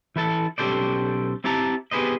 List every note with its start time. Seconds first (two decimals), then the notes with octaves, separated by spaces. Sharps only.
0.16 E3 E4 A4 A5
0.58 B1 C#4 G4 A4 C5 D5
1.44 C4 E4 G4 A5 A#5
1.91 B3 G4 G#4 B4 C5 D#5